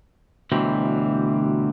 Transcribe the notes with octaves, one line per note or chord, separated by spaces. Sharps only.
D2 B2 E3 F#3 G3 C4